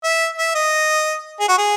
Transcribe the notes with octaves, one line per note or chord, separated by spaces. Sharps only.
E5
E5
D#5
G#4
F#4
G#4